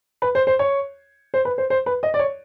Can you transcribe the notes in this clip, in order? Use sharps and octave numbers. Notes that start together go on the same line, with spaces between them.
B4
C5
C5
C#5
C5
B4
C5
C5
B4
D#5
D5
C#5